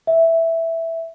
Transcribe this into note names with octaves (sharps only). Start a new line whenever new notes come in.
E5